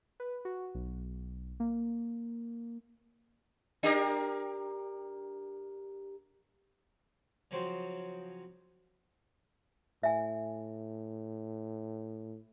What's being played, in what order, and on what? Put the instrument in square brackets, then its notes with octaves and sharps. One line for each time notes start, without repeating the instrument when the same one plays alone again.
[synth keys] B4
F#4
B1
A#3
[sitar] D4 G4 A#4
[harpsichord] C#3 F3 F#3 C4 C5
[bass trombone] A2 [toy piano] E5 G#5